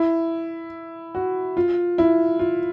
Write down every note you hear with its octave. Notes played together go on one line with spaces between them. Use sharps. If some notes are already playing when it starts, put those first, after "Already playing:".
Already playing: E4
F#4
F4
E4
F4